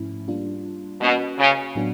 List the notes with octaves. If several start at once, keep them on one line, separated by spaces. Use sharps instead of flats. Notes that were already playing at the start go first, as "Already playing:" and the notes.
Already playing: G#2 F3 A3 C#4 E4
G3 A#3 D4 F4
B2 A#3 C#4 F#4 B4
C#3
A2 F#3 B3 D4 F#4